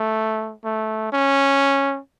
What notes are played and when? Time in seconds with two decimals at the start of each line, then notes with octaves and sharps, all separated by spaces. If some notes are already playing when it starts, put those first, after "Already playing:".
Already playing: A3
0.65 A3
1.12 C#4